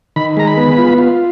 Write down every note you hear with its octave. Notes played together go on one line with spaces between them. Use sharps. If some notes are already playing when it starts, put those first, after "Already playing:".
D#3 B5
G#3 A#5
B5
B3
F4
F4